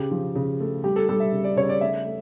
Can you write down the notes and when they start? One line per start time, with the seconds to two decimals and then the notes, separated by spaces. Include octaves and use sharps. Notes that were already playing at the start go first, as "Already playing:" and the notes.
Already playing: C#3 G4
0.11 F3
0.35 C#3
0.60 A3
0.84 G3 G4
0.96 A4
1.09 G3 A4
1.20 E5
1.32 C#3
1.44 D5
1.56 C#3 C#5
1.69 D5
1.81 A3 E5
2.05 A3